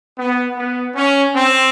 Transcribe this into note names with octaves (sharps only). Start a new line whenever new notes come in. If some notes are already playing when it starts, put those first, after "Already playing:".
B3
B3
C#4
C4